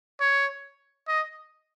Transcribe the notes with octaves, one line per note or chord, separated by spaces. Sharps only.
C#5
D#5